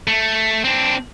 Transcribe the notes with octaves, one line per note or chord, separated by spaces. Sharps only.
A3
C4 D4